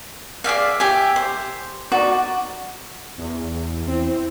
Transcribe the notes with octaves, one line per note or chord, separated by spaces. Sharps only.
G#4 D5 E5 F5
G4 E5 G#5
C5
D#4 F#4 D5
E2
C4 E4